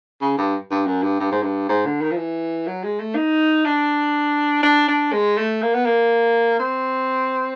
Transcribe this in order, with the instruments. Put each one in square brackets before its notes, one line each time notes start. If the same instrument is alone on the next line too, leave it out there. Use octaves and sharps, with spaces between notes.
[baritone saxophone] C#3
G2
G2
F#2
G2
G2
G#2
G2
G#2
D3
D#3
F3
E3
F#3
G#3
A3
D#4
D4
D4
D4
G#3
A3
A#3
B3
A#3
C4